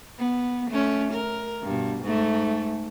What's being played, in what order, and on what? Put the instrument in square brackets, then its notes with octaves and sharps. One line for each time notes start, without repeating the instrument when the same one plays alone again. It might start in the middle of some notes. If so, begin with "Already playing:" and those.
[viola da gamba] B3
A3 C#4
A#4
G2 B2
G#2 A3